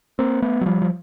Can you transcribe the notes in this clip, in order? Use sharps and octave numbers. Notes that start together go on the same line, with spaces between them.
A#3 C4
A3 B3
F#3
F3 G3
F3